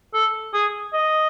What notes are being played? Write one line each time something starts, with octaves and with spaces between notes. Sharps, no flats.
A4
G#4
D#5